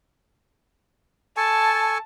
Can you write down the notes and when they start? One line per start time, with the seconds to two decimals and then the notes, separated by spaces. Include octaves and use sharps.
1.37 A4 G#5 A5 C#6